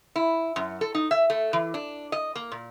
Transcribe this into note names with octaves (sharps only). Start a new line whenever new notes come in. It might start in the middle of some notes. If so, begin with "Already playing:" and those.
E4
F#2
A4
D#4
E5
A3
E3
D4
D#5
A#3
A#2